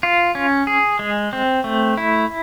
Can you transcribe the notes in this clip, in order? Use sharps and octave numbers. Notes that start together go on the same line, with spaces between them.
F4
C#4
G#4
G#3
C4
A3
E4